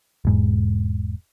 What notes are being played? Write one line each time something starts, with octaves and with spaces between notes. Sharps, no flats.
E1 G#2